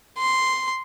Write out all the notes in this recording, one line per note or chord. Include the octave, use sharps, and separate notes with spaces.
C6